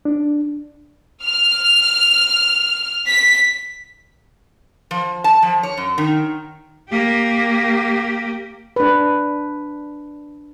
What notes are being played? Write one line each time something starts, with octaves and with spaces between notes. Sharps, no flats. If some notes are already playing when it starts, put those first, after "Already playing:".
D4
F6
B6
F3
A5
F3
C#5
F#2
D#3
A#3 G4
D4 B4